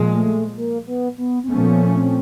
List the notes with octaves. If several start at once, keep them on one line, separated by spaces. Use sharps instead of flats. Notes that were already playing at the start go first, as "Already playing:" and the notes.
Already playing: A#2 F3 G#3
A3
A#3
B3
B3
C4
A#2 F3 A3 B3 C#4
C4